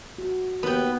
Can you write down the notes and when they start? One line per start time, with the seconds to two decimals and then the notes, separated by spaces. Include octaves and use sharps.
0.18 F#4
0.63 D#2 B3 B4 G5